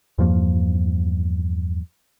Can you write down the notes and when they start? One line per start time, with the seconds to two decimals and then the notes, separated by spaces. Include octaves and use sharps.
0.18 E2 G2 F3 A#3